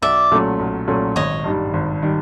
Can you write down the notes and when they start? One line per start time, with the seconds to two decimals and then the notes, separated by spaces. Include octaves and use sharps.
0.02 B1 D5 E5
0.31 A#2 F#3 A3 C#4
0.59 B1
0.88 A#2 F#3 A3 C#4
1.16 G#1 C#5 D#5
1.44 G2 D#3 G3
1.73 G#1
2.02 D#3 G3